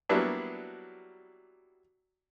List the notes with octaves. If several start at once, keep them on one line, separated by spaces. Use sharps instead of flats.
F#3 G3 A#3 B3 D4 E4